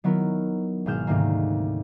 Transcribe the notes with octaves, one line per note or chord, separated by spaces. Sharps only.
D#3 F#3 B3 E4 A#4
G#1 B2 G#4 F6 G6 E7
D2 G#2 C3 D#3 A#3